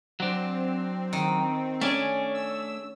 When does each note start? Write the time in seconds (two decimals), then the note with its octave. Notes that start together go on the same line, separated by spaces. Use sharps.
0.20 F#3 C4 D4
1.13 D#3
1.81 A3 C#4 D4 G#4
2.34 E6